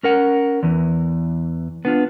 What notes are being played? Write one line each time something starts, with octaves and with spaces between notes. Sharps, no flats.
C#4 A#4 F#5
E2 E3
B3 D4 F4